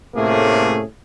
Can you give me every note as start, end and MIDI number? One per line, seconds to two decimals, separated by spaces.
0.16 0.82 45
0.16 0.82 48
0.16 0.82 57
0.16 0.82 58
0.16 0.82 61
0.16 0.82 68